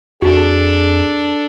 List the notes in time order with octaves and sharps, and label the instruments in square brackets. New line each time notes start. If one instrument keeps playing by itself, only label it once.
[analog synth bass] F2 [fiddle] D4 A4 [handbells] F#4 [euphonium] G#4